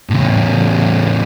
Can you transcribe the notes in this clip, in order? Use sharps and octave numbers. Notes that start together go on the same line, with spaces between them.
A2 C#3